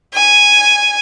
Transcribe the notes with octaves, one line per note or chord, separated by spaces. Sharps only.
G#5